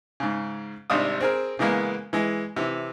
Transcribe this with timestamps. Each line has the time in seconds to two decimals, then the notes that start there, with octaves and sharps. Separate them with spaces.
0.20 G#2 C#3
0.90 G#1 C3 G3 D4 F5 D#6
1.20 C4 G#4 A#4
1.59 C#3 E3 G#3 A#3 B3
2.13 E3 G#3
2.56 C3 E3